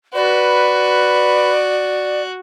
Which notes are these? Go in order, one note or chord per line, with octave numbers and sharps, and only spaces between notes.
F#4 B4 D5